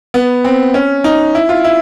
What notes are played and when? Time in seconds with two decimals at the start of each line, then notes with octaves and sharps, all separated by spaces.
0.14 B3
0.44 C4
0.74 C#4
1.04 D#4
1.35 E4
1.49 F4
1.64 E4